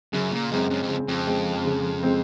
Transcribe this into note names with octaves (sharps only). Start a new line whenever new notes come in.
F#2 C#3
A#2
F#2 G#3 C4
F#2
F2
C#3
F2
G#3 C4
C#3
G#3 C4